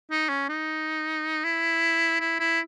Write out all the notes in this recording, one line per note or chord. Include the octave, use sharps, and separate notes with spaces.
D#4
C#4
D#4
E4
E4
E4